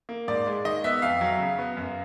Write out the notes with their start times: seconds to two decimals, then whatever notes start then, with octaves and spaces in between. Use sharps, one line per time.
0.09 A#3
0.28 G#2 D5
0.47 G#3
0.65 D#3 D#5
0.84 B3 E5
1.02 F2 F5
1.21 F#3
1.40 C#3
1.58 B3
1.77 F#2